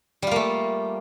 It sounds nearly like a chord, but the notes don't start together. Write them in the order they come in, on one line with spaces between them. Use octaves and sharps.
G3 F4 A#3 A3